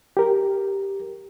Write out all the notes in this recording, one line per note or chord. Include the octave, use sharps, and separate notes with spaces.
G4 A#4